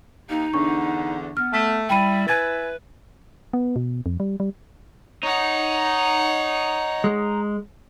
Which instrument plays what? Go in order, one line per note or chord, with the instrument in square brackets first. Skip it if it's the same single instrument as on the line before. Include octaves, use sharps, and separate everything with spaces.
[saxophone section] D#2 [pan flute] D#4
[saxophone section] E2 D3 [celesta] D4 C#6
[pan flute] B3 [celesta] F6
[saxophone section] A3
[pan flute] G3 [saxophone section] E4 [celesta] G5 B5 D#7
[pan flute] B4 [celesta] G#5 G#6 A6
[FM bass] B3
B2
F2
G3
G3
[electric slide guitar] D#4 [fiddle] C#5 F#5
[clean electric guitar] G#3